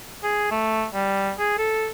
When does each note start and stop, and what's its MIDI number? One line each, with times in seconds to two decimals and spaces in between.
0.23 0.48 68
0.51 0.86 57
0.93 1.32 55
1.39 1.54 68
1.58 1.90 69